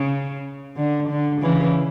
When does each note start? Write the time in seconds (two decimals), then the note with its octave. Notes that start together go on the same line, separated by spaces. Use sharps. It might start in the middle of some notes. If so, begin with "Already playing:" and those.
Already playing: C#3
0.77 D3
1.09 D3
1.41 C#3 E3